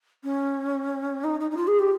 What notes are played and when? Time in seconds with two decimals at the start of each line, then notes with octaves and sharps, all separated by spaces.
0.24 C#4
1.24 D#4
1.40 D#4
1.51 D#4
1.57 F4
1.67 G#4
1.79 G4